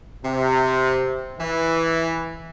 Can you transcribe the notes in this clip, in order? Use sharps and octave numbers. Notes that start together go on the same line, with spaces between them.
C3
E3